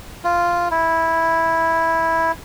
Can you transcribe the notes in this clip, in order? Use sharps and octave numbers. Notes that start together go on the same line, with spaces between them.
F4
E4